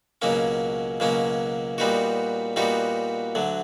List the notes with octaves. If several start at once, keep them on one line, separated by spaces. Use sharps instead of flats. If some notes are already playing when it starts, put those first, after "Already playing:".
C#2 B2 F#3 A#3 C#4
C#2 B2 F#3 A#3 C#4
A#2 G3 B3 D#4 F#4
A#2 G3 B3 D#4 F#4
D2 D3 F#3